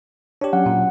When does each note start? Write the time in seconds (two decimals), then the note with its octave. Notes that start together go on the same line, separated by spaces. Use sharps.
0.41 D4 G4 C#5
0.53 F#3 C#4 F#5
0.66 A#2